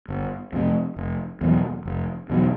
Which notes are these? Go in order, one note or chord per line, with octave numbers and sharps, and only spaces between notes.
G1
F2 C3
F1
E2 B2 F#3
F1
E2 B2 F#3